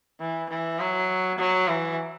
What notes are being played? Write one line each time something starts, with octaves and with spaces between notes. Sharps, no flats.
E3
E3
F#3
F#3
E3